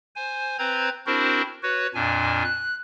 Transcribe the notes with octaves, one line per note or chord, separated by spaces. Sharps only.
C5 G#5
C4 B4 C5 A#5 G#6
C4 D4 E4 F#4 A#4 C5
F#4 B4 C#5
F2 A#2 D4 G#5
F#6